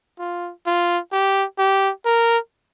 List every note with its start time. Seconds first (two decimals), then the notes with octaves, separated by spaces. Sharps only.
0.19 F4
0.67 F4
1.12 G4
1.58 G4
2.05 A#4